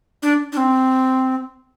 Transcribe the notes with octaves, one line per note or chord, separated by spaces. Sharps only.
D4
D4
C4